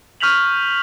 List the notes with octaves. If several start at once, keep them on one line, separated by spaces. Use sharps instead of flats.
C#6 F6 G6 B6 F7 F#7